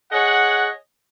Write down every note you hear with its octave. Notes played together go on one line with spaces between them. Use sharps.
G#4 C#5 D#5 F#5